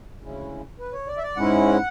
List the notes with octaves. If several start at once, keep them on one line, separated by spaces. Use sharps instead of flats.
D2 C#3 G#3 C#4 E4
B4
C#5
D5
E5
D5
G#2 G#3 C#4 E4 F#5